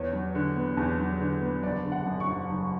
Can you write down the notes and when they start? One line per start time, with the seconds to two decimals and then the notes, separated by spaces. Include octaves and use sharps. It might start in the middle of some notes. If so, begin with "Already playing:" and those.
Already playing: E2 C#5
0.13 F#3
0.35 D3
0.56 B3
0.77 E2
0.99 F#3
1.21 D3
1.42 B3
1.63 F#1 D5
1.85 D3
1.92 F#5
2.06 F#2
2.20 C#6
2.27 F#1
2.49 F#1